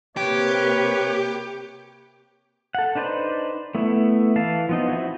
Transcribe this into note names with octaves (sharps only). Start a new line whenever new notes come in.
C3 A#3 G4 B4 C#5
A4 F#5
D4 D#4 B4 C5 D5
A3 B3 E4
E3 F5 A5
F3 B3 D#4
C4 E4 F#4